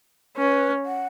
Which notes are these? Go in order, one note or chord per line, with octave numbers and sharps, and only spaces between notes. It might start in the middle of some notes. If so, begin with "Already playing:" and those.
C#4 B4
F#5